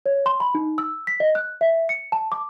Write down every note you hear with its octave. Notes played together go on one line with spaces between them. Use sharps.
C#5
C6
B5
D#4
E6
B6
D#5
F#6
E5
C#7
A5
D6